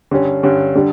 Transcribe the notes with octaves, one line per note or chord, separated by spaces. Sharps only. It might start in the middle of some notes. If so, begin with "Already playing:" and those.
G2 D3 G3 C#4
G2 D3 G3 C#4
D3 G3